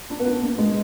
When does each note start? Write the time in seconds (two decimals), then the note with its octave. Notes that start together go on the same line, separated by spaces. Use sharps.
0.10 D4
0.20 B3
0.26 D4
0.42 A#3
0.58 G#3